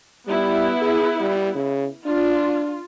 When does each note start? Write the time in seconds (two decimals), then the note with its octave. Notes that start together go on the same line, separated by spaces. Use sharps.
0.27 G3 B3 E4
0.81 G#4
1.20 G3
1.55 C#3
2.06 D4 F4